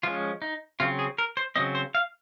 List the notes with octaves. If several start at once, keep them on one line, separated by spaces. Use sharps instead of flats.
F3 G#3 C#4 F4
D#4
C#3 F#3 C4 F4
G#4
A#4
C5
C#3 F#3 C4 D#5
C5
F5